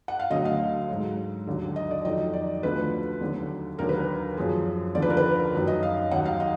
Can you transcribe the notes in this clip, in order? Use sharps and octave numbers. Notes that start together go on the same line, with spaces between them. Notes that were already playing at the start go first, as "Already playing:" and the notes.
F#5
F5
D2 D3 F#3 D#5
F5
G#2 F#3
D#2 D3 F#3
D#5
D5
F2 D#3 F#3 D#5
D5
D2 D3 F3 B4
D#2 D3 F#3
D#2 D3 F#3 A#4
B4
A#4
F#2 F3 G#4
D#2 D3 F3 D5
B4
A#4
B4
F#2 D#3 F#3
D#5
F5
D#2 D#3 F#3 F#5
F5
D#5